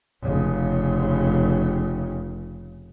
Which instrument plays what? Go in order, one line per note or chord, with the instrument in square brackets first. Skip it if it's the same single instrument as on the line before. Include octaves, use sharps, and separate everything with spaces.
[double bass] F1 C#3